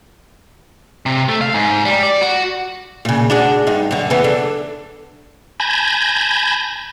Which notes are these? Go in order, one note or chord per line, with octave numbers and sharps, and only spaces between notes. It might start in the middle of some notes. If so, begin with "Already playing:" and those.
C3
A3
F5
G#2
G3
D5
F#4
A#2 C#3
D4 F#4 G#4
G2 D#4
F#2 D3
C#3 E3 B3
D4 A4
G#5 A5 B5 G6 G#6 A#6